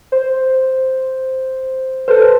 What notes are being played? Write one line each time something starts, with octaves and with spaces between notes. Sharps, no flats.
C5
A4 B4 C5